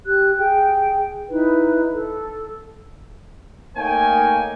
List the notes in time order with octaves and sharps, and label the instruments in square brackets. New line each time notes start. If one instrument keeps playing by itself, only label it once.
[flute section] G4 F#6
G#4 G5
D#4 E4 B4
A4
[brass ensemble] A3 A#3 D#4 C#5 G5 G#5